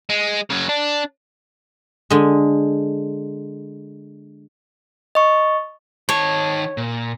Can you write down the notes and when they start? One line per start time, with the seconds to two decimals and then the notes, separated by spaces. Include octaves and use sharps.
0.10 G#3
0.50 C#3 F#3
0.69 D4
2.10 D3 G#3
5.15 D#5 C#6
6.09 D#3 C#5 A5
6.77 A#2